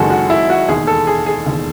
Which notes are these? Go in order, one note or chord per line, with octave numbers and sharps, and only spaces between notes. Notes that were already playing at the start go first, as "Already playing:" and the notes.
Already playing: F#1 F#2 D#3 G#3 F#4 G#4 A4
F#4
E4
F#4
E1 D#2 D#3 G#4
A4
G#4
G#4
E1 D#2 D#3